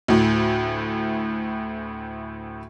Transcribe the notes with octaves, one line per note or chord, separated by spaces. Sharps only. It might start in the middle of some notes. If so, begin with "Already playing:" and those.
D2 A2